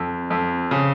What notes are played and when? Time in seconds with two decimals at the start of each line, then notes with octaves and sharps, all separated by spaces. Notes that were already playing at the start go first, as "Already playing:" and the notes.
Already playing: F2
0.30 F2
0.71 C#3